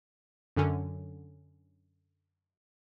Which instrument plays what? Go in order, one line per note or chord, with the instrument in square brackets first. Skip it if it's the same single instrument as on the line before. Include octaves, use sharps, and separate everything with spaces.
[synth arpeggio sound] F#2 D3 C#4